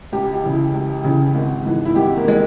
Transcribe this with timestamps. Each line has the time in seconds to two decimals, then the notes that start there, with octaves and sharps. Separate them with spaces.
0.12 C#2 G4
0.33 G4
0.43 C#3 E3
0.53 E4
0.74 C#2
1.04 C#3 E3
1.35 G#1
1.65 G#2 E3
1.85 E4
1.95 G#1 G4
2.16 A#3
2.25 E3 G#3